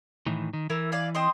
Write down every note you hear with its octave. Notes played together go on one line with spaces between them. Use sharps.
A2 D#3 E3
D#3
E3 E4 A#4 E6
D5 F5 G#5
C4 D#5 C6